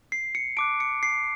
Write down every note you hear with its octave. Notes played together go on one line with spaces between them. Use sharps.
C7
C#7
A5 D6 F#6 D7
C#7
C7